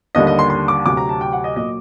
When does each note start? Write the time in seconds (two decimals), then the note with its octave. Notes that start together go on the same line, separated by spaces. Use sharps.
0.15 D#2 D3 G3 D#5
0.27 D#5
0.39 C6
0.50 C6
0.68 D6
0.86 D2 C3 F#3 D6
0.97 A#5
1.09 A5
1.21 G5
1.33 F#5
1.44 D#5
1.56 A#2 F#3 D#5